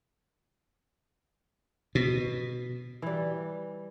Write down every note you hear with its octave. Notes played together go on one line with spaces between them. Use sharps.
B2
E3 G3